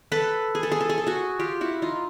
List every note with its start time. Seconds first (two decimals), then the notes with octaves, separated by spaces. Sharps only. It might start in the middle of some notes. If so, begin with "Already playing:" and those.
0.12 A4 B4
0.55 G#4
0.63 A4
0.72 G#4
0.81 A4
0.89 G#4
0.98 A4
1.07 F#4 G#4
1.39 F4 G4
1.61 E4 F#4
1.82 D#4 F4